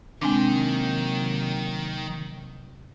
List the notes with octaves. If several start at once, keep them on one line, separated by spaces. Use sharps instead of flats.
C3 D#3 F#3 G#3 A#3 C4 D4 G5